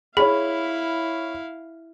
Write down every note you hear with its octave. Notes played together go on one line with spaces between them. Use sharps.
E4 G#4 C#5 F5 B5